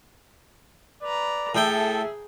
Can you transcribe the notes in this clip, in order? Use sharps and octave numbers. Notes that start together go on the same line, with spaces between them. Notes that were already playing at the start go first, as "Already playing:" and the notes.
B4 D5 A#5
A2 G#4 A4 E5 G5